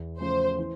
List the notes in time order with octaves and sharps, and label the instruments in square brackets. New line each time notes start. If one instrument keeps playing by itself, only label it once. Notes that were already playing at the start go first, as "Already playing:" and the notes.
Already playing: [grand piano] E2
[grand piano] C#3 F3 A3 C#4 [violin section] C5
[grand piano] E3